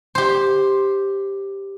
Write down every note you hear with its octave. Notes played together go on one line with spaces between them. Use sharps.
G4 C5